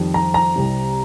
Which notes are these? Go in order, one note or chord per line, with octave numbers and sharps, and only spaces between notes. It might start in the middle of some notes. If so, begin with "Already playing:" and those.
Already playing: F2 D#3 G3
A#5
A#5
C2 C3 G3